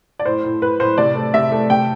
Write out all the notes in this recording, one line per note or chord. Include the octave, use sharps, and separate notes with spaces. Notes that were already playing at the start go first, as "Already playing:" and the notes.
D5
A2 C5
A2
A2 B4
A2 C5
C3 D5
A3
C3 E5
A3
C3 G5